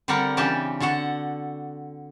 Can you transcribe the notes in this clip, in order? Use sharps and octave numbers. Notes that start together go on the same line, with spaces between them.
D3 G3 C4 D4 A#4 F#5
C#3 E3 C4 D4 G4 A5
D3 F#4 A4 F#5